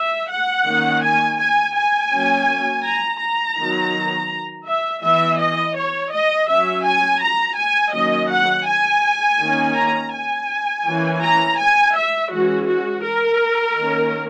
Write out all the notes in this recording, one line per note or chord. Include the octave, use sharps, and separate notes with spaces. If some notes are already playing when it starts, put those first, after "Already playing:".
Already playing: E5
F#5
D#3 A#3 C#4
G#5
G#5
G#5
F#3 A#3 C#4
A#5
A#5
D#3 F#3 B3
E5
E3 B3 E5
D#5
C#5
D#5
F#3 C#4 E5
G#5
A#5
G#5
D#3 F#3 A#3 C#4 D#5
F#5
G#5
D#3 A#3 C#4
A#5
G#5
E3 A#3 C#4
A#5
G#5
E5
E3 G#3 C#4 F#4
F#4
A#4
D#3 A#3 C#4